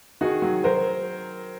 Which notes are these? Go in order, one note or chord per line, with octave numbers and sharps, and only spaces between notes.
D#3 F#4 G#4
F#3
F#3 A#4 C5